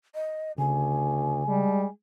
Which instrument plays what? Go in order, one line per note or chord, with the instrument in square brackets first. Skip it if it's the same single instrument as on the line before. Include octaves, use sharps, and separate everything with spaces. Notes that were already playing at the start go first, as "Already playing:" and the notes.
[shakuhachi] D#5
[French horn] D2 [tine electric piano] C#3 [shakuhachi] G#5
[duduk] G3 [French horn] G#3